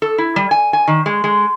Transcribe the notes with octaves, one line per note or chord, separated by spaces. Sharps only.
A4
E4
G3
G#5
G#5
D#3
G#3
G#3